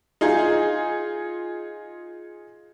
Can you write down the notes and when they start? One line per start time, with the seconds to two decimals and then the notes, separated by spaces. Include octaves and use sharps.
0.21 D#4 F4 G#4